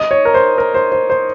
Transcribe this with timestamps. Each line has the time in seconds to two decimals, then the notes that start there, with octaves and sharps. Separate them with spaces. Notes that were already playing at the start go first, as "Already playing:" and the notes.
Already playing: D#5
0.11 C#5
0.25 A#4
0.34 C5
0.58 A#4
0.74 C5
0.92 C5
1.10 C5